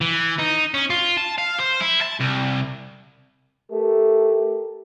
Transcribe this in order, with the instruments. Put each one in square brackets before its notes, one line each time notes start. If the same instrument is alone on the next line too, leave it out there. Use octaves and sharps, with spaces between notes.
[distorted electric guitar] E3
D#4
C#4
F4
A5
F5
C5
E4
A5
C2
[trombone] A3 [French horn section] G4 A4 A#4